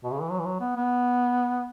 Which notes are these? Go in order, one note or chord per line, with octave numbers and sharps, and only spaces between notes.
B2
C#3
E3
F#3
E3
F#3
B3
B3